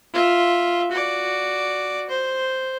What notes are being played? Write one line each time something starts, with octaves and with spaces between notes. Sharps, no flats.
F4 E5
F#4 D5
C5